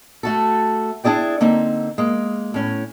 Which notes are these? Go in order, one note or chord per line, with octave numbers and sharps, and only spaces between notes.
A3 F#4 A4
D4 E4 G#4 D5 G5
D3 A#3 C4 D#4
G#3 A#3
A2 C#4